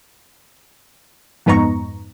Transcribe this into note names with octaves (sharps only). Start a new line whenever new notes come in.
F2 G#2 B3 D#4 A#5 C#6